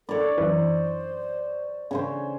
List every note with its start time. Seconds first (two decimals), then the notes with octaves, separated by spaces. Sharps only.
0.09 A4 C#5 D5
0.38 F#2 E3 C5
1.91 C#3 C#4 C5